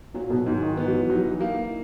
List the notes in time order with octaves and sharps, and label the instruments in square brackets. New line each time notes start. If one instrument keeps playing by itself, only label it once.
[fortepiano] A#2 [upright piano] F#3
[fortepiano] B2
[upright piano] G#2 [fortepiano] E3
[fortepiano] D#3
[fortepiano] E3 [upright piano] B3
[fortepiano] F#3
E3
[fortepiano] F#3 [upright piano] D#4
[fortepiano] E3
[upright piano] A#3